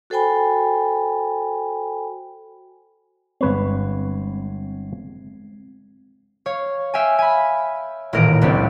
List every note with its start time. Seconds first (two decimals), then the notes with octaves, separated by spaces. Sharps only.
0.10 F#4 A4 C5 G5 G#5 B5
3.41 G1 G#3 C4 B4 C#5
6.46 C#5 F5
6.94 E5 F5 G5 G#5
7.19 G#5 B5
8.13 D#1 A1 A2 A#3 A#4 D7
8.42 F#1 C#2 B3 C4 D4